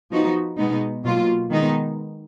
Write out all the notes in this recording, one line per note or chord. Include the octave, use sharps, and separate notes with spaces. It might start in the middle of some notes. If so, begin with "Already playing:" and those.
F3 B3 D#4 F#4
B2 G#3 B3 D#4
B2 F#3 A#3 F4
D#3 G#3 B3 D#4